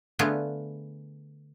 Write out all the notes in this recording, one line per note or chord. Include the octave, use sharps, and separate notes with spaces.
D3 A3 B3 F4 G#4